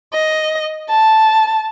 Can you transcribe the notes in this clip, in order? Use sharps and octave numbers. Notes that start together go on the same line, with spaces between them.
D#5
A5